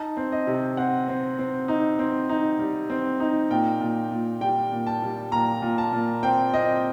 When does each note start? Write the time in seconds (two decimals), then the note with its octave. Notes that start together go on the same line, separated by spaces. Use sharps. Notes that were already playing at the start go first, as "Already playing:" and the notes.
Already playing: D#4 A5
0.17 C4
0.32 D#5
0.47 C3
0.77 C4 F#5
1.08 C4
1.39 C4
1.68 D#4
1.99 C4
2.29 D#4
2.59 G3
2.90 C4
3.20 D#4
3.50 A#2 G5
3.81 A#2
4.11 A#2
4.41 G3 G5
4.72 A#2
4.87 A5
5.02 G3
5.31 A#2 A#5
5.62 A#2
5.78 A5
5.93 A#2
6.23 C4 G5
6.54 C4 D#5